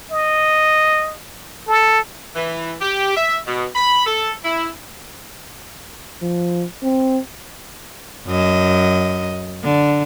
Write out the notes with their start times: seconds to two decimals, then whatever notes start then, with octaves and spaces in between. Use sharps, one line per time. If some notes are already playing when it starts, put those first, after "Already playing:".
0.11 D#5
1.68 A4
2.36 E3
2.81 G4
3.17 E5
3.47 B2
3.75 B5
4.06 A4
4.44 E4
6.22 F3
6.83 C4
8.27 F#2 D#5
9.63 D3